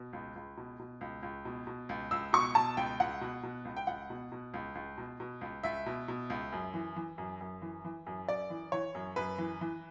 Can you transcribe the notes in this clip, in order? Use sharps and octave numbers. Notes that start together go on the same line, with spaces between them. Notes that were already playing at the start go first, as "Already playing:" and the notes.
Already playing: B2
C#2
C#2
B2
B2
C#2
C#2
B2
B2
C#2
C#2 E6
B2 C#6
B2 A5
C#2 G5
C#2 F#5
B2
B2
C#2
G5
C#2 F#5
B2
B2
C#2
C#2
B2
B2
C#2
C#2 E5
B2
B2
C#2
F#2
E3
E3
F#2
F#2
E3
E3
F#2
F#2 D5
E3
E3 C#5
F#2
F#2 B4
E3
E3